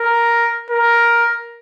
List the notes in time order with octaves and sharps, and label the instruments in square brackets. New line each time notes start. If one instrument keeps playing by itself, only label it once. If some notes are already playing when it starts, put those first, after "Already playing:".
Already playing: [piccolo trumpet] A#4
A#4